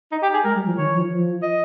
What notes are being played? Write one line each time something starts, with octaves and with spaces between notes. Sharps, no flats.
D#4
G4
G#4
G#3 A#4
G3
F3
D#3 C#5
F3
F3
D#5